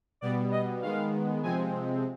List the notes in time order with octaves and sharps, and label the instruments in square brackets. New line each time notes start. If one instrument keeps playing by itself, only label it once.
[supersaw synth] B2 G3 B3 D5
D#5
D#3 G#3 B3 F5
C3 F3 G#3 C4 G#5